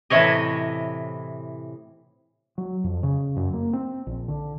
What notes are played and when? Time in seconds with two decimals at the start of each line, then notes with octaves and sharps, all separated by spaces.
0.10 A2 C3 E3 E4 C#5 D#5
2.58 F#3
2.84 F2
3.03 C#3
3.36 F#2
3.54 A#3
3.73 C4
4.07 A#1
4.28 D3